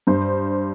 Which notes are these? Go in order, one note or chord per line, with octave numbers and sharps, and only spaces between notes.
G2 C5